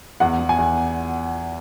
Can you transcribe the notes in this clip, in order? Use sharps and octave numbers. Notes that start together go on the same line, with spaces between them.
E2 F#5
E2
G#5
E2